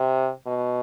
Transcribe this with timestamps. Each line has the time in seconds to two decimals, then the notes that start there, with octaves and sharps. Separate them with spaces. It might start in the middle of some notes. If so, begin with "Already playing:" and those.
Already playing: C3
0.46 B2